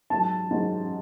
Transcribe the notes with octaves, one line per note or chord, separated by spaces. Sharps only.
G#2 F#3 A5
G#2 F#3